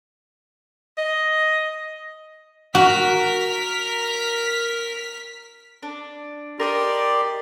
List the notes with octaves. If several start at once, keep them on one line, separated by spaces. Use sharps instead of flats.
D#5
F#4 A#4 F6 B6
D4
G4 A#4 D5 D#5 C6 D6